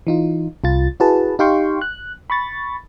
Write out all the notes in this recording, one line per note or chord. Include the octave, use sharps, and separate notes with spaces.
E3 D#4 F4
C2 F4 A6
E4 F#4 G#4 B4 A5
D#4 G4 F5 G5 C6 C#6
F#6
B5 C#6 A6